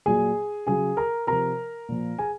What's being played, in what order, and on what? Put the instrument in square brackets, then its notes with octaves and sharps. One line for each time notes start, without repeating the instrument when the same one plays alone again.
[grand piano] A#2 F#3 G#4 G#5
C#3 F#3 G#4 G#5
A#4 A#5
C3 F3 A#4 A#5
A#2 F3
G#4 G#5